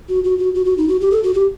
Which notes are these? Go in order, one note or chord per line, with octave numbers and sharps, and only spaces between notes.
F#4
F#4
F#4
F#4
F#4
D#4
F#4
G4
A4
F#4
G4